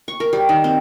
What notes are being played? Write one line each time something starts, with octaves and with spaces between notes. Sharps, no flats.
C#6
A#4
G3
D#3
C4